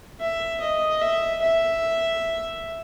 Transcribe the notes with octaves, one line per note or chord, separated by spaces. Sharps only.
E5
D#5
E5
E5